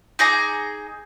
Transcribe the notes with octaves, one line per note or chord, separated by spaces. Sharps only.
D#4 G#4 A#5 D6